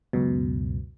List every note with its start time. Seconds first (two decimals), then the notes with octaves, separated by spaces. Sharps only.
0.13 C#2 F#2 B2